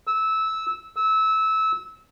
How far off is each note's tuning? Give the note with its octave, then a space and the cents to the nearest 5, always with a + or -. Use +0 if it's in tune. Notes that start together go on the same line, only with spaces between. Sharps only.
E6 -15
E6 -20